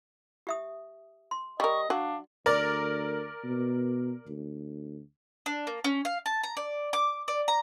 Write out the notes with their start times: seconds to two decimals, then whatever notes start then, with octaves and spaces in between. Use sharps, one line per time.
0.47 G4 E5 D#6
1.31 C6
1.60 G3 A#4 D#5 C#6
1.90 F#3 D4 F#4 F5
2.46 D2 A#4 D5
3.44 B2
4.27 D2
5.46 D4
5.67 A#3
5.84 C#4
6.05 F5
6.26 A5
6.43 A#5
6.57 D5
6.93 D6
7.28 D5
7.48 A#5